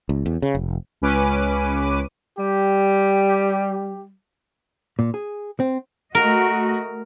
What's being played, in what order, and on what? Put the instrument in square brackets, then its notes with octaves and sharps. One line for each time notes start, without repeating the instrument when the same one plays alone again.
[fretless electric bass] C#2
E2
C#3
F1
[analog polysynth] C#2 C#4 B4 D6 D#7
[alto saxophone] G3 [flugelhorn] G4
[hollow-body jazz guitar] A#2
G#4
C4
[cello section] A3 F#4 D#5 [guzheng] A#4